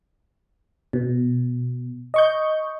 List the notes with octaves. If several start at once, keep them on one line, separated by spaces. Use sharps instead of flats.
B2
D#5 C#6 G6